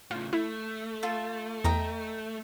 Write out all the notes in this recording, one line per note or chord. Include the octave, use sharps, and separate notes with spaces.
A2 C#3 F4
A3 E4
F4 A4
E2 D#5 G5 A#5